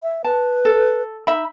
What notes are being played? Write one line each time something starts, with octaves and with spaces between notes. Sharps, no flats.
E5
B4 A5
A4
D#4 E5 B5